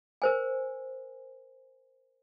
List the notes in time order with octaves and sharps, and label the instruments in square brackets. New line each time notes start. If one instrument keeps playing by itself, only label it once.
[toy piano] A#4 C5 G#5